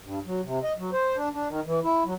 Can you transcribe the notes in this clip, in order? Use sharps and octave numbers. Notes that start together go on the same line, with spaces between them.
G2
F#3
C3
D#5
F#3
C5
D4
D4
D#3
E3
E4
F#3